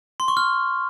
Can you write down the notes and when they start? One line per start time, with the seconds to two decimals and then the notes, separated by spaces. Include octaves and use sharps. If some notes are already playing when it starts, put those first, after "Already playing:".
0.20 C6
0.28 C#6
0.37 F6